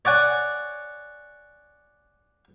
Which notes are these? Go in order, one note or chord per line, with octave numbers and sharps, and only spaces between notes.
C#5 D5 F#5 G#5